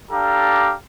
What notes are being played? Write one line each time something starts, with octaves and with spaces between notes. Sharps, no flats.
D4 G4 A4 F5 A#5